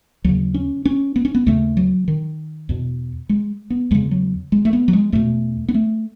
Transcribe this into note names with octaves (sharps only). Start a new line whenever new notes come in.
D#2 C#3 F#3
C#4
C#4
B3
C#4
B3
D#2 C#3 A3
F#3
D#3
E2 B2
G#3
B3
E2 C#3 G#3
F#3
G#3
A3
B3
F#3
G#3
E2 B2 A3
B3
A3